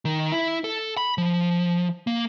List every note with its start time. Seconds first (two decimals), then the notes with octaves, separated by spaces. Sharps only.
0.05 D#3
0.32 E4
0.64 A4
0.97 B5
1.18 F3
2.07 A#3